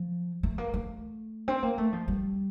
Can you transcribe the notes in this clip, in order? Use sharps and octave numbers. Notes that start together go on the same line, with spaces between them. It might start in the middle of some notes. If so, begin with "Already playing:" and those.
Already playing: F3
A3
A#3
A3
C4
A#3
A3
F3
G3